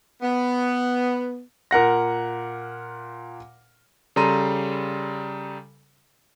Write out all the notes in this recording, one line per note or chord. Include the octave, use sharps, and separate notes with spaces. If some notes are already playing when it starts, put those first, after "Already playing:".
B3
A#2 A#4 F#5 A#6
C#3 G3 A4 A#5 C6 D#7